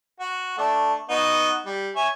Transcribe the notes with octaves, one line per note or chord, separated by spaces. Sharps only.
F#4
A3 D4
B3 D#4 F#4
G3
C#5 E5 G#5